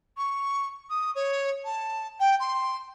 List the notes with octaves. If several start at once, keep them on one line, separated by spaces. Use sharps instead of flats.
C#6
D#6
C#5
A5
G5
C6